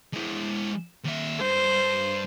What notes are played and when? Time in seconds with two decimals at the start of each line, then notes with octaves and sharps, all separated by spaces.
0.14 G#3 E4
1.04 D#2 E5
1.41 G2 C5